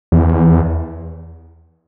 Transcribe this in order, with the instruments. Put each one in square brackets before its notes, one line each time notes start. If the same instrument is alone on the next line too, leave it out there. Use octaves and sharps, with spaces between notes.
[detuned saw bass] E2